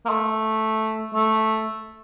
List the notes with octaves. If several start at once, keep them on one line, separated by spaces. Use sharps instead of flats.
A#3
A3
A3